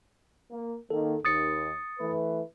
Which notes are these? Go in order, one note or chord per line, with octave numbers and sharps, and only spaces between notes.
A#3
D#3 A#3 A4
D#2 D#6 A6 C#7
E3 A3 B4